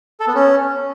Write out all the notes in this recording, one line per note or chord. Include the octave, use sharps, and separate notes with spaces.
A4
B3
C#4